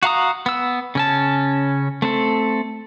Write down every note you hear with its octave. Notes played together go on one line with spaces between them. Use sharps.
F#4 F5 A#5 D#6
B3 E6
C#3 C#4 A5
A3 C4 A4